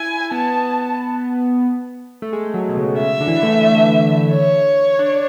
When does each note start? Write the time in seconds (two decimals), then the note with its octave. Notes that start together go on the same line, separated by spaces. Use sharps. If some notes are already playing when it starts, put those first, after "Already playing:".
Already playing: E4 G#5
0.31 B3 A5
2.22 A3
2.33 G#3
2.54 F#3
2.69 B2
2.77 C#3
2.95 B2
2.99 C#3 E5
3.20 D3
3.28 E3
3.35 D3
3.43 A3
4.32 C#5
4.99 D4